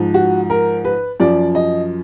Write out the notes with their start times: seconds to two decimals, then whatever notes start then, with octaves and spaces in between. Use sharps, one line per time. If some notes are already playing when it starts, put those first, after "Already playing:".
Already playing: G#2 F3
0.14 F#4
0.50 A#4
0.85 B4
1.20 F#2 F3 D5
1.55 D#5